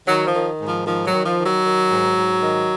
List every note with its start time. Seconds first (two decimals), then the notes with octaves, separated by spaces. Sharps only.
0.08 D#3 F#3
0.27 F3
0.35 D#3
0.60 G#2
0.66 F3
0.86 D#3 F3
1.06 F#3
1.13 D#3
1.25 F3
1.39 D#3
1.45 F#3
1.64 D#3
1.91 G#2
2.17 G#2
2.42 D#3